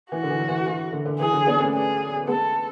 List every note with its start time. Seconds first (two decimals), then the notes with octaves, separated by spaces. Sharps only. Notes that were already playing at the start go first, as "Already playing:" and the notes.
0.11 E3 F#4
0.23 D3
0.30 E3
0.40 F#3
0.48 E3
0.66 E3
0.93 D3
1.06 D3
1.19 E3 G#4
1.33 D3 F#3
1.47 B3 D4
1.60 A3 C#4
1.74 G#4
2.27 G#3 B3 A4